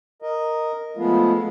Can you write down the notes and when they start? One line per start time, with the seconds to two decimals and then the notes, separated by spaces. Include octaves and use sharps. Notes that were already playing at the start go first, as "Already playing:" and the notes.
0.22 A#4 D#5
0.97 F3 G#3 A3 B3 F4